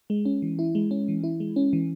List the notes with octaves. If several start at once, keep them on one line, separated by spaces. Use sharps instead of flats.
G#3
C#4
E3
E4
G#3
C#4
E3
E4
G#3
C#4
E3